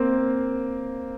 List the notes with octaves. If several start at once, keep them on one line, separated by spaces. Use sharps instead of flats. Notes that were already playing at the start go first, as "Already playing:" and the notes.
Already playing: A#3 C4